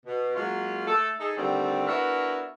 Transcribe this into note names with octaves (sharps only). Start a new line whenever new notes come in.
B2
F#3 G#3 A#3 C#4 F4
A3 A4
D#4 G#4 A4
D3 D#3 G3 A3 C4
B3 D4 E4 F#4 A#4 B4